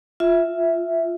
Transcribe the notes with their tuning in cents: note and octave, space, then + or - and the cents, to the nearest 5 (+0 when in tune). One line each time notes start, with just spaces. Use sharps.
F4 +0 E5 +0